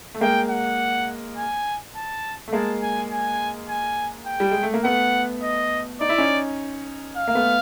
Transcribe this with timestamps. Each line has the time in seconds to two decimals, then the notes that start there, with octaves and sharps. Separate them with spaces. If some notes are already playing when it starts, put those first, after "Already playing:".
0.15 A3
0.21 G#3 A#3 G5
0.50 F#5
1.37 G#5
1.96 A5
2.48 A3
2.53 G#3 A#3 A5
2.82 G#5
3.10 G#5
3.69 G#5
4.26 G5
4.40 G3
4.51 G#3
4.63 A3
4.74 A#3
4.84 A3 B3 F#5
5.43 D#5
6.01 D#4 D5
6.09 E4
6.18 C#4 D#4
7.17 F5
7.28 A#3
7.35 A3 B3